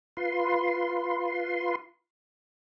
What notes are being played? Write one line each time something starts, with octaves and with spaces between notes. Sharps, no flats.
F4 B4 C6